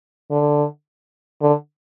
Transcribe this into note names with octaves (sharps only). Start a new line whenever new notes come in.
D3
D3